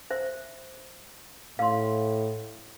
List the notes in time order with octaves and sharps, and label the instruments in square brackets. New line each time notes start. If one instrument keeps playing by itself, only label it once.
[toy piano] C5 E5
[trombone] A2 [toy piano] F5 C6